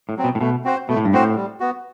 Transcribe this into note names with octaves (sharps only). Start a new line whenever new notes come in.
A2
F#3 C4
B2
A2
B2 A3
C4 F#4 C5
B2 A3
A2
G2
A2 C4 F#4 C5
G3
B3 F#4